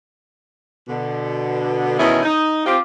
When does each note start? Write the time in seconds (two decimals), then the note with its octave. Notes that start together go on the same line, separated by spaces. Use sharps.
0.88 B2 D3
1.99 E2 B2 D#3 C#4 D#4 E4
2.23 D#4
2.66 C4 F4 G4